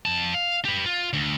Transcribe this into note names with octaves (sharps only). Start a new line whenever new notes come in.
F2 A5
F5
G4 B4
F4
D2